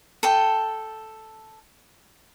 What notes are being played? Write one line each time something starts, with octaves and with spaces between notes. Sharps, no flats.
A4 G5